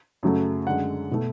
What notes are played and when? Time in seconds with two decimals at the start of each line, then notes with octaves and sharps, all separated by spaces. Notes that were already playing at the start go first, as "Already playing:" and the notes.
0.23 F#2 C#3 F#3 A3
0.66 F#2 D3 G#3 F#5
1.11 B2 A3